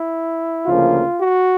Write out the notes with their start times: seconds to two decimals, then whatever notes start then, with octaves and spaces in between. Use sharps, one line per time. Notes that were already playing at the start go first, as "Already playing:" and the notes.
Already playing: E4
0.66 D2 C#3 F3 A#3 F4
1.19 F#4